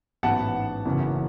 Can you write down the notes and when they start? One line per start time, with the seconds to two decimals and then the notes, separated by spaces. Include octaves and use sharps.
0.23 A1 G#2 F#3 B3 F#5 A5
0.85 F#1 F#2 C#3 E3